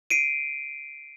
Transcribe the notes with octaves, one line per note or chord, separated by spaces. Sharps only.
C7 D7 D#7